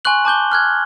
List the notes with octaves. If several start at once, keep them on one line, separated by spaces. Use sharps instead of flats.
G#5 C6 C#6 F#6 F#7
A5 D6 G6 G7
F6 F#6 G#6